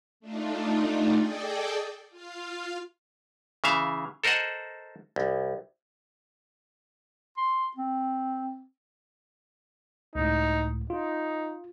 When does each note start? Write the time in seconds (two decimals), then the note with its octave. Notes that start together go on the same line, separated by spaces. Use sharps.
0.20 A3 D4 D#4 F4
1.17 G#4 A4 D5 D#5 G5
2.10 F4 F5
3.64 C#3 E3 E5 F5
4.24 A4 A#4 C5 D#5 F#5
5.16 C2
7.37 C6
7.77 C4
10.15 C#2 A2 D#4
10.90 D#4 F4